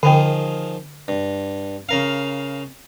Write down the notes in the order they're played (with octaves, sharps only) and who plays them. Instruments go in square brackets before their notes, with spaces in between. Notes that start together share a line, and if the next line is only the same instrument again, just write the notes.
[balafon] D3 G5 [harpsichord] D#3 F3 G#4
[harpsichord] G2
C#3 A#4 F5